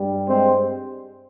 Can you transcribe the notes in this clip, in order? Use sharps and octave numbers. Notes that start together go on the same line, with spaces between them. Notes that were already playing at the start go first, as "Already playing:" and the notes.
Already playing: G2 G3
G#3 C4